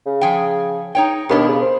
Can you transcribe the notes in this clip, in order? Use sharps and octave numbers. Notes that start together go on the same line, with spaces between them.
C#3
F3 G#4 G5
D#4 C#5 G5
D#2 B2 B3 D4
C#3
C5